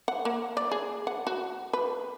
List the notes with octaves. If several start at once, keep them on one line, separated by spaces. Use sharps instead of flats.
F#5
A#3
D5
G#4
F#5
F#4
B4